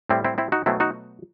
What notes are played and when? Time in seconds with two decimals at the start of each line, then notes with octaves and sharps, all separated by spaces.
0.09 A2 G3 C4 E4
0.24 C4 E4
0.38 C4 E4
0.52 D#4 F#4
0.66 B2 F#3 A3 C4 E4
0.80 D#4 F#4